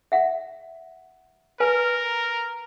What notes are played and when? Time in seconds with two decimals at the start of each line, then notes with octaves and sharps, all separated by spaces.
0.12 E5 F#5
1.60 A#4 B4 G#5